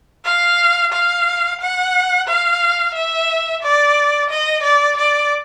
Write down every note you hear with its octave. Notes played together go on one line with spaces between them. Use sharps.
F5
F5
F#5
F5
E5
D5
D#5
D5
D5